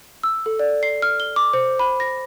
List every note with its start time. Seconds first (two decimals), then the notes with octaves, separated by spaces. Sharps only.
0.23 E6
0.46 A4
0.59 D5
0.83 C7
1.02 F6
1.20 G7
1.36 D6
1.53 C5
1.79 B5
2.00 A#6